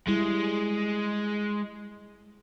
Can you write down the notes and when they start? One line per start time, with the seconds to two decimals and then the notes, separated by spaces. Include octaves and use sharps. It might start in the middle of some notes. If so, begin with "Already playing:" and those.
0.07 G3 G#3 E4